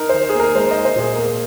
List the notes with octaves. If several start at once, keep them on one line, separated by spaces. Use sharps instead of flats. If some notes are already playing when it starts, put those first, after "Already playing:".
Already playing: D#4 A#4
D#3 C5
G#4
A#3
A#4
G#3 C5
D#4 D#5
C5
A#2 G#4
A#3 A#4